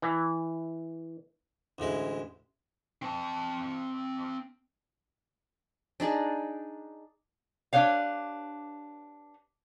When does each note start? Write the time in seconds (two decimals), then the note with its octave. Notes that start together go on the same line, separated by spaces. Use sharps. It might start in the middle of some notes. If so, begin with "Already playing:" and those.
0.02 E3
1.78 A1 D2 G#3 E4
3.02 C4 A5
6.00 D4 D#4 G#4 D5
7.73 D4 G4 B4 C#5 F5